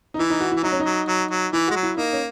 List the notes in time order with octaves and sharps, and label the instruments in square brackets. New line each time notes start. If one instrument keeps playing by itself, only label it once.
[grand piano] D#4
[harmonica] E3 [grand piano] E4
[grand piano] D#4
F#4
[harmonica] E3 [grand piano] E4
[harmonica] F#3 [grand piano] D#4
[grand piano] C#4
D#4
[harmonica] F#3
F#3
F#3
[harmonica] E3 [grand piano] E4
[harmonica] G#3 [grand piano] F#4
[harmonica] F#3
[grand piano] E4
[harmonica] A#3 [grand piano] D#4
[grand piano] C#4